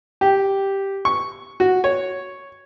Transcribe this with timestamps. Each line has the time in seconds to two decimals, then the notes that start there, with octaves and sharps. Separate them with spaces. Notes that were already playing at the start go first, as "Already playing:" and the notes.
0.21 G4
1.05 C#6
1.60 F#4
1.84 C#5